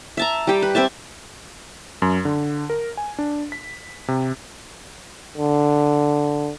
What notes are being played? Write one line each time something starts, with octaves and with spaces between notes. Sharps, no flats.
E5 A5 A#5
G3 G4
B4
C4 C5 E5 A5
F#2
D3
A#4
G#5
D4
B6
C3
D3